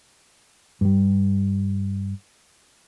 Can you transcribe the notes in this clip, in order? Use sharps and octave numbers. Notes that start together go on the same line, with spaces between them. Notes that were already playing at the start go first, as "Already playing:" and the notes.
G2 G3